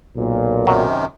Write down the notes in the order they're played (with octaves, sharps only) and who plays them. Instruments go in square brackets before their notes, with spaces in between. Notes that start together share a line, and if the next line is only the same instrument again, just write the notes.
[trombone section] B1 A#2
[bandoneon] F#2 C3 D#3 [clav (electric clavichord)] F#3